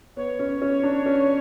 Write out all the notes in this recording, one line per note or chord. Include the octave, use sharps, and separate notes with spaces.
B3 C#5
C#4
C#4
D4
C#4